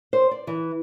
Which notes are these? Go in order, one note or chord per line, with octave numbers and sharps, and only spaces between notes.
C5
D5
E3